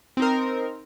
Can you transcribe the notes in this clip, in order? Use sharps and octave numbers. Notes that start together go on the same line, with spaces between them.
C4 D#4 A#4